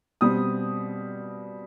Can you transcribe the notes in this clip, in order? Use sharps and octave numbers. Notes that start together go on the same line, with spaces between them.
B2 G3 C4 D#6